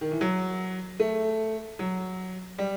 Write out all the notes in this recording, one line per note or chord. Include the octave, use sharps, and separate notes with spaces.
D#3
E3
F#3
A3
F#3
G3